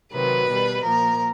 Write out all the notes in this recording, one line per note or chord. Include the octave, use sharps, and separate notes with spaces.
C3 D#3 F#3 B4
B2 G3
A#2 F3 A#4